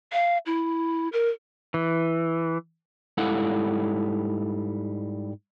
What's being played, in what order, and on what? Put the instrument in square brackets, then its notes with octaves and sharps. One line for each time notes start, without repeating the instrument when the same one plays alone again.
[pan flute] F5
E4
A#4
[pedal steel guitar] E3
[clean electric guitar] G#2 G3 E4 A4 F5 F#5